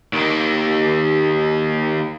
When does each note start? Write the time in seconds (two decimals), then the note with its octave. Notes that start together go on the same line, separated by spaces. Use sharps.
0.13 D#2 A#3